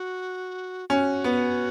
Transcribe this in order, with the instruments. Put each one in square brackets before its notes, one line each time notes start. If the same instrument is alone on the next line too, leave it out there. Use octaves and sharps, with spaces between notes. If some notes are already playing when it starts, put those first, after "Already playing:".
Already playing: [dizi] F#4
[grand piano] C#4 [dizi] F#4
[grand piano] B3